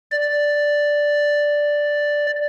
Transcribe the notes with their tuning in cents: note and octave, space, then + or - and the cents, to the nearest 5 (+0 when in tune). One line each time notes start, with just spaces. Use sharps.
D5 +0